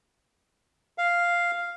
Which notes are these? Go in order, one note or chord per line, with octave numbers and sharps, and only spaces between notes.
F5